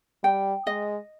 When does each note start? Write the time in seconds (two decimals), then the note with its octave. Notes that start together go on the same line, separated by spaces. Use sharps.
0.23 G3 G5
0.67 G#3 D#5